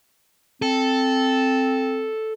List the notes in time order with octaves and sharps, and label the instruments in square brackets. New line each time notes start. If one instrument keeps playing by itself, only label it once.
[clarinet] C4 [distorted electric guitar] A4